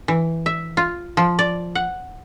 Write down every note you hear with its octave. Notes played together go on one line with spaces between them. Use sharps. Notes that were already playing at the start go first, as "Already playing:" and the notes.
E3
E5
F4
F3
D5
F#5